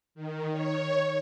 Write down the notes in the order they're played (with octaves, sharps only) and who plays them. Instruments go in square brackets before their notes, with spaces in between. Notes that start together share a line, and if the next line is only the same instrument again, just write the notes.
[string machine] D#3
C#5